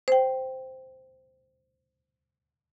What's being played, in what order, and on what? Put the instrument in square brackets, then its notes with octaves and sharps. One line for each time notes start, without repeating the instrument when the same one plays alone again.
[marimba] C5 G5